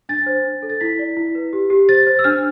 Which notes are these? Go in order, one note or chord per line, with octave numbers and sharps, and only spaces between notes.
D4 A6
C5
D4
A4
A6
E4 B6
D5
E4
B4
G4
G4
C5 A6
C5
E6
D4 F6